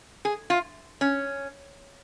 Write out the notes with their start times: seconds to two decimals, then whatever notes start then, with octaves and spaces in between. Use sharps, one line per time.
0.25 G#4
0.50 F4
1.01 C#4